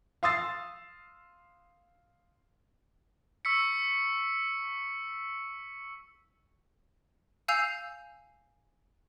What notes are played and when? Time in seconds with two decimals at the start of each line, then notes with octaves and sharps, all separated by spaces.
0.23 F5 C6 D#6 E6 A6 C7
3.45 C#6 E6 B6 C#7
7.48 F5 G#5 E6 G6 C7 F7